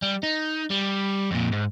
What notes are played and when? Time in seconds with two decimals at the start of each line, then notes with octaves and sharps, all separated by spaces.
0.02 G3
0.23 D#4
0.70 G3
1.31 F2 A#2
1.52 G#2